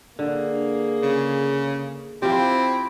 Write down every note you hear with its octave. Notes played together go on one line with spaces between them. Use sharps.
D3 A#3 G#4
C#3
F3 C4 E4 G4